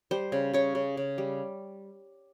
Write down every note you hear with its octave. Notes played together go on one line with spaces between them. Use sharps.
G3 C5
C#3
C#3 C#5
C#3
C#3
G3